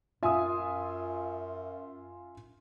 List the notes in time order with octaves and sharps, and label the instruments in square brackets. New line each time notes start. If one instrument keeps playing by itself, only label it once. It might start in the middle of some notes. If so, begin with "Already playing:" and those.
[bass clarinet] F#2 [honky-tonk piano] F4 D#6 [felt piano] E5 G#5